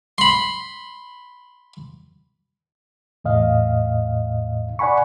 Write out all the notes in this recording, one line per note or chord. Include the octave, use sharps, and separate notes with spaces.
B5 C6
E2 A2 D#5 F5
D5 F#5 G#5 B5 C#6